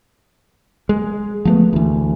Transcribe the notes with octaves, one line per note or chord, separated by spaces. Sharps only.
G#3
F3 A3 B3
D2 E3